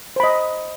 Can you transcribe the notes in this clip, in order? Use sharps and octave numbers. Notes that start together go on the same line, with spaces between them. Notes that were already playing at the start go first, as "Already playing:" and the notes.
C5 D#5 B5